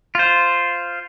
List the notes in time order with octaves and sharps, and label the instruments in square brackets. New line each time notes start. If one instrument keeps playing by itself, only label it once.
[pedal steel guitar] F4 C5